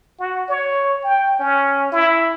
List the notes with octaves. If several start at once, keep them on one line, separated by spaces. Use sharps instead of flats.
F#4
C#5
G5
C#4
E4